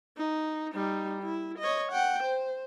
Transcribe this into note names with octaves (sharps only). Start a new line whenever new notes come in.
D#4
G3 D#4
E4
C#5 D#5
F#5 G5
C5